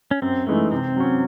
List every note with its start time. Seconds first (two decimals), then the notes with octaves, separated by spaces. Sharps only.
0.11 C#4
0.22 F#2 C4
0.47 E3 G#3 A3 D#4
0.72 C3 C4
0.96 F#3 C#4